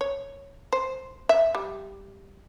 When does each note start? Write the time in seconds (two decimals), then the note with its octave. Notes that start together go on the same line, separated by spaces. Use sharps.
0.01 C#5
0.73 C5
1.29 E5
1.55 G3